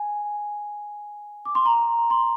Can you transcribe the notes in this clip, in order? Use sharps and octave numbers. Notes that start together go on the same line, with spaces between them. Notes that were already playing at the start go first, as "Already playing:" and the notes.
Already playing: G#5
D6
C6
A#5
C6